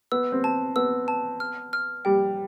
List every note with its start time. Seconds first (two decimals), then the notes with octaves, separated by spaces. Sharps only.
0.12 B3 E6
0.32 C4
0.44 A5
0.76 B3 E6
1.08 A5
1.40 F6
1.73 F6
2.05 G3 G5